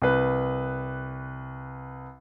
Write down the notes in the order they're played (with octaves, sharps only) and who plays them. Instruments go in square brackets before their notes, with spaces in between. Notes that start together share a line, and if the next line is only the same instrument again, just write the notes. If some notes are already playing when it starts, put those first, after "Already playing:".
[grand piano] C2 B4